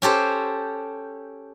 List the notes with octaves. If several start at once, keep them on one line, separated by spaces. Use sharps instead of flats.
C#4 G4 A4 C5